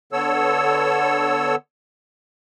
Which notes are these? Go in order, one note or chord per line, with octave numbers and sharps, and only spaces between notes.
D3 B3 A4 C#5 E6